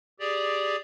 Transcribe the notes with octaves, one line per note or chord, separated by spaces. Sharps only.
G4 G#4 D5